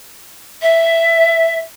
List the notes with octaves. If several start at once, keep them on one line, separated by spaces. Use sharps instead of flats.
E5